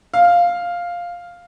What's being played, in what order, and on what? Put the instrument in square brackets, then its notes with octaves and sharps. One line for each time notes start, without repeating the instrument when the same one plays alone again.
[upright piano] F5